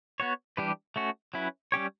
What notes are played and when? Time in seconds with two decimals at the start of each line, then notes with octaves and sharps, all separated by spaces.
0.20 B3 F#4 C#5
0.57 E3 G3 D4 G4 B4
0.96 A3 C#4 F#4
1.34 F#3 C#4 E4 B4
1.72 G3 C#4 G4 C#5